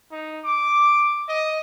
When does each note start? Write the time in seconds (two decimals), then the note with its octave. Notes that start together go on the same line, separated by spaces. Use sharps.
0.11 D#4
0.44 D6
1.28 D#5